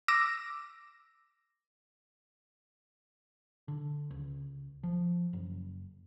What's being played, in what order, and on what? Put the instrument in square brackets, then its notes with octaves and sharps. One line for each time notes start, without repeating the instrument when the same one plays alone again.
[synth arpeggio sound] D6 E6 A#6
[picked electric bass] D3
C#2
F3
F#1